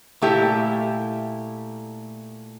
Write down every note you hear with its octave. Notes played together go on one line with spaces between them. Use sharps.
A#2 A3 E4 G4